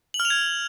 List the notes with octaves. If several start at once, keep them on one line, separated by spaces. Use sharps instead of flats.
F#7
F6
F7
G#6